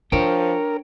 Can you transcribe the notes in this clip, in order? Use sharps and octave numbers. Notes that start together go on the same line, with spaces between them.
F3 D4 A#4 C#5 G5